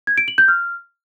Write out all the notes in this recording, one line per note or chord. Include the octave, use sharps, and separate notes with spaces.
G#6
D7
F#7
G6
F6